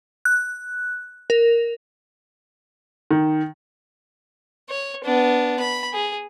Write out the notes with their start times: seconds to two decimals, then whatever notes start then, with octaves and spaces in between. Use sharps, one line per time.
0.25 F#6
1.30 A#4
3.11 D#3
4.69 C#5
5.04 B3 D4
5.60 B5
5.93 G#4